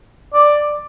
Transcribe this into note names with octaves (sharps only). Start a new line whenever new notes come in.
D5